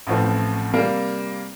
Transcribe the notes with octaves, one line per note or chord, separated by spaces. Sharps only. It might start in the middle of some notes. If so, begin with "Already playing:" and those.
A1 A2 F3 A3 C4
C3 G3 A#3